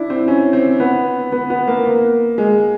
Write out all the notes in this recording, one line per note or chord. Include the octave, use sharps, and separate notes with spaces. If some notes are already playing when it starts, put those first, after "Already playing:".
Already playing: D4 E4
C4
C#4
C4
B3
B3
B3
A#3
A#3
G#3